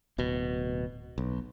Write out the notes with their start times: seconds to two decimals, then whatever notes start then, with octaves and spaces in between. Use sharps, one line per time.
0.18 D1 B2
1.18 B1